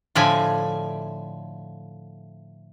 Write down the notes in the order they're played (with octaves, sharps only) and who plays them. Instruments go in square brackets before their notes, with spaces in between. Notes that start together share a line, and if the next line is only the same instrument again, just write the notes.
[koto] A2 D3 F3 E5 G#5